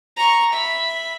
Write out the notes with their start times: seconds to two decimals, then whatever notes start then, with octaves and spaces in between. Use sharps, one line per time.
0.16 A#5 C#6
0.52 E5 B5